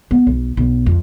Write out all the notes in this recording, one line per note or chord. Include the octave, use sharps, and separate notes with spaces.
B3
B1
B1
F2